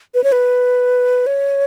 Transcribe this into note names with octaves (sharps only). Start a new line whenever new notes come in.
B4
C#5
B4
C#5